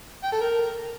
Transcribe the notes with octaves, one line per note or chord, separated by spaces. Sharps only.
G5
A4
A#4